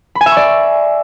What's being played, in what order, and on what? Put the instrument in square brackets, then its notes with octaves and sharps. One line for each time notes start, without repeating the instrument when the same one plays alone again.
[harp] B5
G#5
E5
C#6
D5